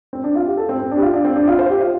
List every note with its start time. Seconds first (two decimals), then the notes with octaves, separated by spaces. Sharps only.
0.13 C4
0.24 D4
0.35 F4
0.47 G4
0.57 A4
0.69 C4
0.80 C4
0.91 D4
0.97 G4
1.02 F4
1.13 D4
1.25 C4
1.36 D4
1.48 F4
1.59 C5
1.69 G4
1.81 F4